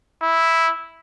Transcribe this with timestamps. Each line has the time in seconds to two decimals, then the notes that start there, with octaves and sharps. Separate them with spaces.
0.22 E4